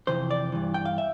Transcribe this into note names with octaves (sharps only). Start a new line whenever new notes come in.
F2 C3 E3 C5
D5
G2 E3
G5
F5
E5